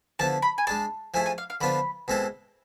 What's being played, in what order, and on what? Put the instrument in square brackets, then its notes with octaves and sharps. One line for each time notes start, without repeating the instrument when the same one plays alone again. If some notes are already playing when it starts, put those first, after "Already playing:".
[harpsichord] D3 F3 B3 E4 [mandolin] A5
[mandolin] B5
G#5
[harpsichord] G#3 D4 G#4 [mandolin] A5
[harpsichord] F3 A3 E4 G#4 [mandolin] G#5
[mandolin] G#5
F5
F5
[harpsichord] D3 F3 B3 D4 F4 [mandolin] B5
[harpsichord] B2 G#3 C4 E4 A4